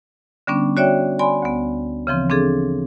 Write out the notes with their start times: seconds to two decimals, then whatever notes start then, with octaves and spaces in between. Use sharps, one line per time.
0.47 D3 G3 B3 C#4 D4
0.77 F#4 C#5 D5 E5 G5
1.19 D5 G#5 B5 C6
1.42 D2 B3
2.07 C#3 E3 F3 C4
2.30 C4 D4 G#4 A4